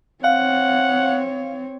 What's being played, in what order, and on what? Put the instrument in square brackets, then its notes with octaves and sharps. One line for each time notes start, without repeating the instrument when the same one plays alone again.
[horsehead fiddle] C4 C#5 [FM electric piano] F5 [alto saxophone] F#5